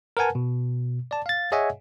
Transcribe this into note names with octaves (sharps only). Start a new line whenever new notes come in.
A#4 B4 F#5 G#5 A5
B2
D5 A5
F5 A6
G#4 C#5 D#5 E5 F#5 G#5